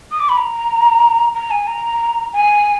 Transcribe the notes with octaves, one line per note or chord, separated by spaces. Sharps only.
D#6
D6
B5
A#5
A#5
G#5
A#5
G#5